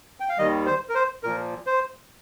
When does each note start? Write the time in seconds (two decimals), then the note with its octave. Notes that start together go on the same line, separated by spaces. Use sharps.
0.20 G5
0.29 F5
0.38 D#2 D#3 G3 D#5
0.66 C5
0.89 A#4
0.95 C5
1.23 A#2 F3 A#4
1.66 C5